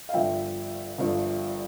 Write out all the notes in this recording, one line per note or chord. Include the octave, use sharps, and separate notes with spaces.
F5
G1 G2 F3 E5 G5
G1 G2 F3